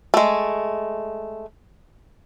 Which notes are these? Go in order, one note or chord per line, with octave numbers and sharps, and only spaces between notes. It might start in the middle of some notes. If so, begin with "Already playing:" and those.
G#3 A3